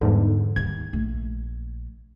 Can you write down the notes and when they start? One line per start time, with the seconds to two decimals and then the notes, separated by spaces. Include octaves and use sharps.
0.01 E2 G#2 D3 G3
0.56 D#2 G#6
0.93 A#1 A3